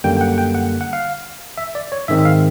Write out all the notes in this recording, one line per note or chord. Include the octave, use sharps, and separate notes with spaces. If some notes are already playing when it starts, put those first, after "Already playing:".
F#2 D3 G3 A#3 G5
G5
F#5
G5
F#5
F#5
F5
E5
D5
C#5
G#2 D#3 G#3 C4 E5
E5
F5